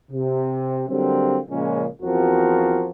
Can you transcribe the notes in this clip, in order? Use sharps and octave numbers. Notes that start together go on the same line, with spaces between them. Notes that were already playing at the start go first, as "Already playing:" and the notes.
C3
D3 F#3 G3 A#3 C4
A#2 C#3 F3 G#3 A#3 C#4
E2 F3 C4 F4 F#4 A#4